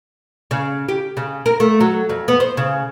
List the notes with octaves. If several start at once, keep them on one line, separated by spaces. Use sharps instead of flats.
C#3
G4
C#3
A#4
A3
F#3
F2
B3
C5
C#3